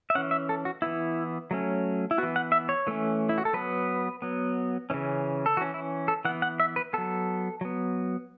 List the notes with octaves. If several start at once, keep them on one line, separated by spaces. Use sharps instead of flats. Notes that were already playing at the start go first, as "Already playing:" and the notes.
E5
E3 C#4 F#5
E5
A4
F#4
E3 B3 E4
F#3 A3 C#4
E4
E3 B3 F#4
F#5
E5
C#5
E3 A3 C#4
E4
F#4
A4
F#3 B3 B4
F#3 B3
C#3 E3 C#4
A4
E3 C#4 F#4
E4
A4
E3 B3 F#5
F#5
E5
B4
F#3 B3 A4
F#3 B3